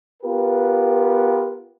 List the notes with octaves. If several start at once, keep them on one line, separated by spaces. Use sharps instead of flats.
B3 F4 G4 A#4 B4